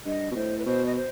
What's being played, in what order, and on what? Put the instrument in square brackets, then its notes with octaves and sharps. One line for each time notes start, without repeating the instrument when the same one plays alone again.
[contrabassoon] G2 [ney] D#5
[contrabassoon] B2
[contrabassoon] A2 [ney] C5
[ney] B4
[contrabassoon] B2 [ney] C5
[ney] D#5
C5